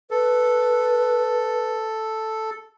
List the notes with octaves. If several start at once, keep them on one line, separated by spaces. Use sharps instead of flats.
A4 B4